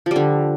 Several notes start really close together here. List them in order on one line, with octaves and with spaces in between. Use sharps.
F3 G3 D3